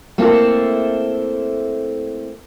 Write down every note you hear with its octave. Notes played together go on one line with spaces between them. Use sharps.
A3 A#3 C4 E4 A4